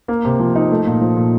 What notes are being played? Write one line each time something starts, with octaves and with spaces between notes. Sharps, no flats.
A#3
C3
F3
D#4
A3
A#2
F3
A#2